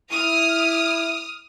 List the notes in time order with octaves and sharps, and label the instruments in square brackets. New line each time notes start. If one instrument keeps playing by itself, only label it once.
[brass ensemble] E4 [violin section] D#6 F6